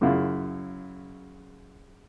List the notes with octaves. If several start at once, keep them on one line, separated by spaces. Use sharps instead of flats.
F#2 C#3 E4 F4